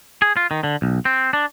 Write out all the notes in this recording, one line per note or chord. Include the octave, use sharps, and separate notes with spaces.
G#4
F4
D#3
D3
B1
C4
D4